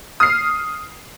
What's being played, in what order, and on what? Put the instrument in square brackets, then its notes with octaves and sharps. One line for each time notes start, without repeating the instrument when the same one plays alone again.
[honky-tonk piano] D#6 F6 C7